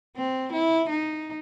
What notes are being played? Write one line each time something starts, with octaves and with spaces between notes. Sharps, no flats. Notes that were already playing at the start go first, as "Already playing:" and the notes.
C4
E4
D#4